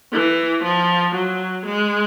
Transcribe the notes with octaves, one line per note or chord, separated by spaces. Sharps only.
E3
F3
F#3
G#3